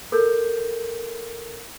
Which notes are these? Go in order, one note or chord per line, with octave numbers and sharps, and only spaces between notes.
A4 A#4 G6